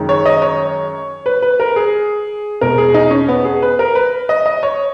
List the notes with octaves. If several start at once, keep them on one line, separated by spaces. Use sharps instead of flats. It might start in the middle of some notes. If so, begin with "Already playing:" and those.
Already playing: F#2 D#3 G#3
C#5
D#5
C#5
B4
B4
A#4
G#4
E2 B2 G#3 A#4
G#4
D#4
C#4
B3
G#4
B4
A#4
B4
D#5
D#5
C#5